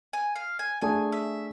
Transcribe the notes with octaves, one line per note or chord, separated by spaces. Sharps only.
G#5
F5
G#5
A3 D4 G#4 G#5
E5